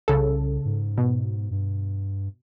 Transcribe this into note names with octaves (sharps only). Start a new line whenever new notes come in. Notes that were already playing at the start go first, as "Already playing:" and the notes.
C2 C#3 A4
G#2
B2
G2